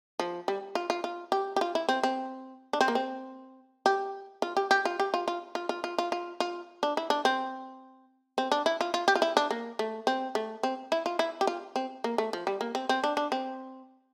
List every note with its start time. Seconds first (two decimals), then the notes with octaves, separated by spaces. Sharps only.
0.19 F3
0.48 G3
0.75 F4
0.90 F4
1.04 F4
1.32 G4
1.56 G4
1.61 F4
1.75 E4
1.89 C4
2.03 C4
2.73 D4
2.81 C4
2.88 A#3
2.95 C4
3.86 G4
4.42 F4
4.57 G4
4.71 G4
4.85 F4
5.00 G4
5.14 F4
5.28 F4
5.55 F4
5.69 F4
5.84 F4
5.98 F4
6.12 F4
6.40 F4
6.83 D4
6.97 E4
7.10 D4
7.25 C4
8.38 C4
8.52 D4
8.66 E4
8.81 F4
8.94 F4
9.08 G4
9.15 F4
9.22 E4
9.37 D4
9.51 A#3
9.79 A3
10.07 C4
10.35 A3
10.63 C4
10.92 E4
11.06 F4
11.19 E4
11.41 G4
11.47 F4
11.76 C4
12.04 A#3
12.18 A3
12.33 F3
12.47 G3
12.61 A#3
12.75 C4
12.89 C4
13.04 D4
13.17 D4
13.32 C4